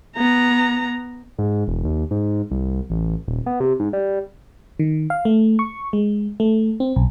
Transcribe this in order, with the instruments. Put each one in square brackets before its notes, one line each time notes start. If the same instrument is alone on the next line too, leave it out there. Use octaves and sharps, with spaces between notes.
[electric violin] B3 A#5
[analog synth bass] G#2
E1
D#2
G#2
C2
A1
D#1
B3
C3
G#2
G3
[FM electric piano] D#3
F5
A3
C#6
G#3
A3
C4
B1